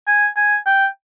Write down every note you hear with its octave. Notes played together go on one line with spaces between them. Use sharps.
G#5
G#5
G5